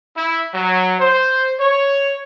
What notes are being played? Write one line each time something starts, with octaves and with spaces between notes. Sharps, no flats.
E4
F#3
C5
C#5